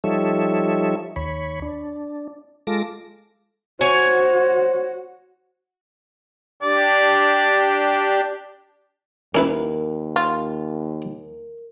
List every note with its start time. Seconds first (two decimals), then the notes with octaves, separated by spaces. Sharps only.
0.04 F3 G3 D#4 A4 C#5 E5
1.16 D#2 C#5 B5
1.62 D4
2.67 G#3 F4 A4 D6 A#6
3.81 F#4 C5 C#5 G#5
6.63 D4 G4 D5
9.35 D#2 C#4 E4 A#4 B4
10.16 F4